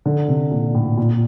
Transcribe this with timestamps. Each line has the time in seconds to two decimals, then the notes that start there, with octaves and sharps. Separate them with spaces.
0.06 D3
0.28 C3
0.51 A#2
0.74 A2
0.98 A#2